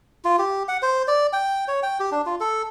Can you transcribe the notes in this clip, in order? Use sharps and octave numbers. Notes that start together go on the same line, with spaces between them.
F4
G4
F#5
C5
D5
G5
C#5
G5
G4
D4
F4
A4